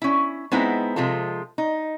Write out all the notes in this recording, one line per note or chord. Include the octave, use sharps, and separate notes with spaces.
C#4 E4
G#3 B3 C4 D#4 E4
C3 F3 G#3 F4 A4
D#4